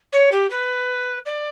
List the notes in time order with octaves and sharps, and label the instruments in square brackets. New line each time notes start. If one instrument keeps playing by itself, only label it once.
[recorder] C#5
G4
B4
D5